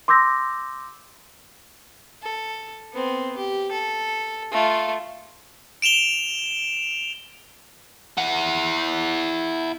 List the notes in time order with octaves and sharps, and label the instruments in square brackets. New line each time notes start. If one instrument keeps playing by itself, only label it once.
[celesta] C6 D6 E6 G6 A#6
[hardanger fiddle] A4
B3 C4
G4
A4
A3 F4
[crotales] D7 E7 F7 G7
[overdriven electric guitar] E4 F#5